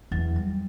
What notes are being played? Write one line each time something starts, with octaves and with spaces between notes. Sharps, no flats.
E2 F#3
G3